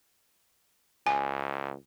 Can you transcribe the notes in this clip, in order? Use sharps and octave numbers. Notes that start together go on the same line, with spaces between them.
C#2 G#5